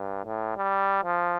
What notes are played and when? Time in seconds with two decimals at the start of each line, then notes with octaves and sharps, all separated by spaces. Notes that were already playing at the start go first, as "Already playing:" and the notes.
Already playing: G2
0.25 A2
0.57 G3
1.04 F3